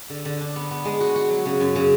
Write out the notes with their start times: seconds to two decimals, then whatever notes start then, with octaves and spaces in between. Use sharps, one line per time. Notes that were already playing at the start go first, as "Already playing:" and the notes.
0.10 D3
0.25 D3
0.41 D4
0.56 B3
0.71 B3
0.85 G#3
1.00 F#4
1.16 F#4
1.30 F#3
1.46 C#3
1.60 F#2
1.75 C#3